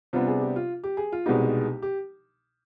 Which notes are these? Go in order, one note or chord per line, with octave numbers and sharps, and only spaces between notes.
C3 G3 B3 D4 F4
G#4
G4
F4
G4
G#4
F4
C2 B2 G#3 B3 D#4 G4
G4